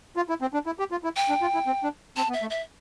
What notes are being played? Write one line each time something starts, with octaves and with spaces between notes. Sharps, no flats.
F4
E4
C4
D4
E4
G4
F4
E4
G5
D4
F4
E4
C4
D4
C4 A5
B3
E5
A3
E5